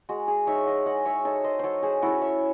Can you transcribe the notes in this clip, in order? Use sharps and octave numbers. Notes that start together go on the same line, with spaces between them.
G#3 F#4
G#4
D#4 C#5 E5
D#5 F#5
G#3 D#5 F#5
C#5 E5
D#4 A4 C#5
C5 D#5
F#3 A4 C5 C#5
G#4 C5
C#4 E4 F#4 A4
C#5 E5